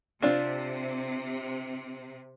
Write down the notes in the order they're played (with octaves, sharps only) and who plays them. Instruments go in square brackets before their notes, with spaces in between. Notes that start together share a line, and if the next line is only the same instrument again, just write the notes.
[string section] C3 [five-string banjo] C4 D4 F4